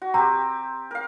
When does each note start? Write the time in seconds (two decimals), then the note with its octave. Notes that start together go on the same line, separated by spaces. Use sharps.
0.02 F#4
0.14 C4 G4 A#5
0.91 A#4 F5